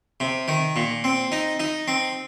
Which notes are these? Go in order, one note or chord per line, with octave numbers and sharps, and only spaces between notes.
C3
D#3
A#2
C4
D#4
D#4
C4